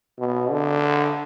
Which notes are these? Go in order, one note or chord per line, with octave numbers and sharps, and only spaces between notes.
B2
D3